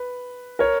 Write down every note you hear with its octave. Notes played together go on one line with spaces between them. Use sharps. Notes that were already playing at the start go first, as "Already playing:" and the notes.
Already playing: B4
A#4 C#5